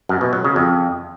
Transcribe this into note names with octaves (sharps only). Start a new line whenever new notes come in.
F#2
B2
F#3
C#3
F2